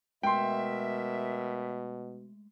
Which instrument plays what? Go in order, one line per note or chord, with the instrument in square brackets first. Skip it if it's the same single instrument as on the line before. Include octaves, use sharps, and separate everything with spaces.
[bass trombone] B2 [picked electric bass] G#3 A3 [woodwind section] A#4 E5 [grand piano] G5 C6